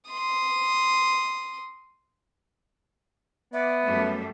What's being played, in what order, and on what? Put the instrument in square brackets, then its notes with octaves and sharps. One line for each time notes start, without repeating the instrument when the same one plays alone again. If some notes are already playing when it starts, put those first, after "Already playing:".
[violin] C6 D#6
[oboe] B3 [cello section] D5 [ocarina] E5
[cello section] F#2 G3 A3